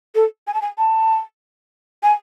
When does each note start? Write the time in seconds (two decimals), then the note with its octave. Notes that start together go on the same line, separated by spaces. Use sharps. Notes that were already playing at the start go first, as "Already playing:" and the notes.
0.15 A4
0.47 G#5
0.54 A5
0.62 G#5
0.78 A5
2.03 G#5